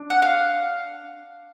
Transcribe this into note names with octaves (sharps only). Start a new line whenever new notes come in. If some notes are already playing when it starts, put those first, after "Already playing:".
Already playing: D4
F#5
F5